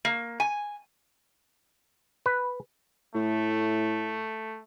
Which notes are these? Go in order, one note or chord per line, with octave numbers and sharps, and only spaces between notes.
A#3
G#5
B4
A2 A3